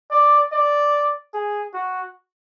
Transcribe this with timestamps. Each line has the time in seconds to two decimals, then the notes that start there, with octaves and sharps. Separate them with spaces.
0.11 D5
0.52 D5
1.34 G#4
1.73 F#4